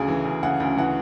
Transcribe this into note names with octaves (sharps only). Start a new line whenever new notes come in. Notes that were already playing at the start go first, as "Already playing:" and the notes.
Already playing: D2 C#3 G#4
E3
D2
C#3 F#5
D2
E3 F#5